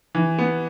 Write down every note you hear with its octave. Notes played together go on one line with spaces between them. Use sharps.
E3
B3